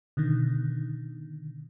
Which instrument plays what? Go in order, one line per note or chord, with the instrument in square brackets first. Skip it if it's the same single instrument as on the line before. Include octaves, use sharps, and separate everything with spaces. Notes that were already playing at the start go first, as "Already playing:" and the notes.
[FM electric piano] B2 D3 D#3